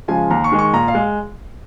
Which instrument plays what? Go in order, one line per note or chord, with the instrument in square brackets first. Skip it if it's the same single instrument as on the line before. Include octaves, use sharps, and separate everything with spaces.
[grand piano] C#3 F3 G#3 F4 G#5
D#2 A#5
C#6
D#3 G#3
C#6
A#2 A#5
F5
G#3